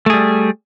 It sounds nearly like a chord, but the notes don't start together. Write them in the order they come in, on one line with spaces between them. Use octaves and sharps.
A3 G#4 G3